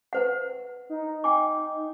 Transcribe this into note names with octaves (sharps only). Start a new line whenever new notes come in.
B4 C5 F#5
D#4
G5 G#5 D6